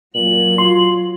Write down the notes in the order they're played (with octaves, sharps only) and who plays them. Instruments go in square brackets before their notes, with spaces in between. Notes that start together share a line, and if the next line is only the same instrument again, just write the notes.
[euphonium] A#2 [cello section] F#3 [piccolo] F#7
[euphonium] F4 [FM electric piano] C6